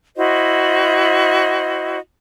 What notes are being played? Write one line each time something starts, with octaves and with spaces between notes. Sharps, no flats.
E4 F#4 C5 D#5